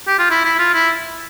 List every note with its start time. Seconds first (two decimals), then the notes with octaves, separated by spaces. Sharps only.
0.08 G4
0.19 F4
0.30 E4
0.45 E4
0.59 F4
0.74 E4